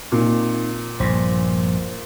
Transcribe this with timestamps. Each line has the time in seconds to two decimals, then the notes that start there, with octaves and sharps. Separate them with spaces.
0.12 A#2 C4 D#4
1.00 A#1 G2 C5